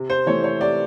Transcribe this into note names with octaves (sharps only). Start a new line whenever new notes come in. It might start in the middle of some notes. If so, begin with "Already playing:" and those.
Already playing: C3
C5
E3 A3 C#5
C#5
C3 D5